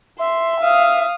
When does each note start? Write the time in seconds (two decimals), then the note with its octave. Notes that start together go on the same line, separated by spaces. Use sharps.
0.19 E5 C6
0.61 F5 D#6